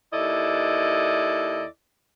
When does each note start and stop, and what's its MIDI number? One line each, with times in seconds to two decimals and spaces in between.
0.14 1.65 39
0.14 1.65 64
0.14 1.65 69
0.14 1.65 74
0.14 1.65 75